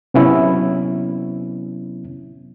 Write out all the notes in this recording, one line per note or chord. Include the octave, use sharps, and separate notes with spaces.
C3 F#3 B3 C#4 E4